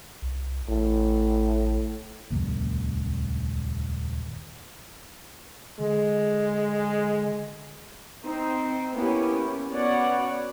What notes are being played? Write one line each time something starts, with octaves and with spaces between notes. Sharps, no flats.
C2
A1 A2
D#1 C#2 F#2 A#3
D3 G#3
C4 D#4
A#3 B3 C#4 E4 G4
B3 C#4 F#4 C#5 D5 F#5